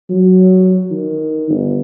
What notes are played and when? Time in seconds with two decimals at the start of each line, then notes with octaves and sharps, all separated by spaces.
0.10 F#3
0.91 D#3
1.50 G1